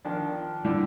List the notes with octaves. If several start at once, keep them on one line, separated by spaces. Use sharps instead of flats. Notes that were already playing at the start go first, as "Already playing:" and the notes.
D#3 F3 D4
D3 G3 E4 F4 D5